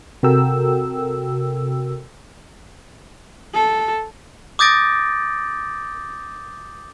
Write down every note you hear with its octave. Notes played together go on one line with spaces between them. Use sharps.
C3 F#4 A4 A#4 G5 E6
A4
D6 D#6 G6 A6 A#6 D7